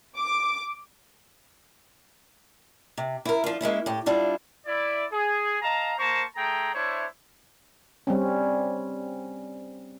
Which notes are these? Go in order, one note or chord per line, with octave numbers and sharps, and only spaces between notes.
D6
C3
E4 A#4
F3 D4 F4
G#3 A#3 C#4 E4
A2 G4
G3 D4 E4 F4
E4 D5
G#4
D#5 F5 A5 A#5
A#3 C5 A5 A#5 C#6
A3 G#4 G5 A#5
D4 E4 C5 C#5 E5
G3 C4 C#4